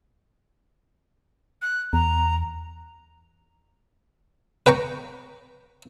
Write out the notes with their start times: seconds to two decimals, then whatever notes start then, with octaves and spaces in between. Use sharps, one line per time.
1.62 F#6
1.93 E2 A#5
4.66 B4 G5 A#5 C#6